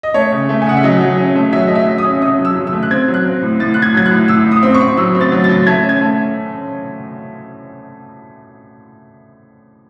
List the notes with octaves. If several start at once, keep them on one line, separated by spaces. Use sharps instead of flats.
D#5
A3 C#5
C#3
A3
G#5
C#3 F#5
E5
F#3 D#5
F#3
C#4
A3
F#3 E5
A3 D#5
E5
F#3
D#6
C#4
C#4 D#6
F#3
E6
F#3
E6
A3
F#6
C4 G#6
F#3
F#6
C4
A2
A2 A6
A2 F#6
G#6
F#3 G#6
F#6
A2
A2 E6
A2
D#6
C4
C#6
C4
F#3 E6
C4
A6
F#3
A6
F#3
A3 G#6
C#4
G#6
A3